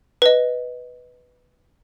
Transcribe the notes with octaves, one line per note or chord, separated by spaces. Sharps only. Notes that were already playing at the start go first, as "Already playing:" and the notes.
B4 D#5